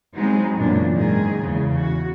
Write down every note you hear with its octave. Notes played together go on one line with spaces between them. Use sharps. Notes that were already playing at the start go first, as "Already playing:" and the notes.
F#3 G#3 B3 C4 D#4
F#2 A#2 C#3 E3 D4
G#2 D#3 G#4
E2 C#3
F#4